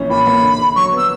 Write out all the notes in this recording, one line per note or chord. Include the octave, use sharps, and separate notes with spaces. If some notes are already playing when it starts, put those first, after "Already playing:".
Already playing: A#1 E3 C#4
A#2 B5
A#3
D3
D3
F#3 C#6
B3
E6